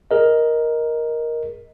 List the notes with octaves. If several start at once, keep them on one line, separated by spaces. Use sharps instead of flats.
G#4 A#4 D#5